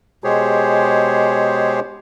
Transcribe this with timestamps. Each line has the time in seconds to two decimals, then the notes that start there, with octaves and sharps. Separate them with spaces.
0.24 B2 G#3 G4 G#4 C5 C#5